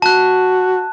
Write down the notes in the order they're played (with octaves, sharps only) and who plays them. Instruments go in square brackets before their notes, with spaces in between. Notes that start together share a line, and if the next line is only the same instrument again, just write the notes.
[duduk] F#4 [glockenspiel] A5 F#6